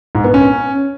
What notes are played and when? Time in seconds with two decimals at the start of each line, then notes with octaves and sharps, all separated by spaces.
0.15 G#2
0.24 B3
0.34 C#4